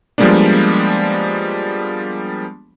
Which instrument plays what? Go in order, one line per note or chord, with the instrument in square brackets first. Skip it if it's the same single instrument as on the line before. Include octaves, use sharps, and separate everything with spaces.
[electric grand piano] F3 G3 G#3 A#3 B3 D4